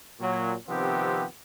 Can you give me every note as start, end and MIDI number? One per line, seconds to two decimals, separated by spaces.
0.20 0.54 46
0.20 0.54 54
0.68 1.25 48
0.68 1.25 51
0.68 1.25 53
0.68 1.25 59
0.68 1.25 60
0.68 1.25 67